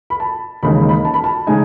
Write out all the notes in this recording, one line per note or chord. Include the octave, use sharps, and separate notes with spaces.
B5
A5
E1 D#2 C#3 G#3 D#4 B5
B5
A5
B5
A5
C#3 G#3 D#4 G#5